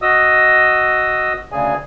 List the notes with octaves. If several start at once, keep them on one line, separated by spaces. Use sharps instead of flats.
F#4 D#5 D#6 E6
D2 C#3 G#4 G#5